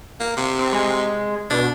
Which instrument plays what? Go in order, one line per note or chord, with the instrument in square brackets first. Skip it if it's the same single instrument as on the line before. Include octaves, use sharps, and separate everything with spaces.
[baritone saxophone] A#3
C3
[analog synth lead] C4
G#3
[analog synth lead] B2 [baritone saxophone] D4